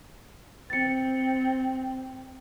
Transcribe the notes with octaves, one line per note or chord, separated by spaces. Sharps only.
C4 A6 C#7